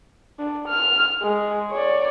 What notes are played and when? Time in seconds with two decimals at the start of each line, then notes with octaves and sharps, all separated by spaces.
0.39 D4
0.68 F6
1.23 G#3
1.71 C#5 D5